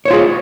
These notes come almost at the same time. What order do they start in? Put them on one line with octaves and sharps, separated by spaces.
C#5 C5 F4 G#4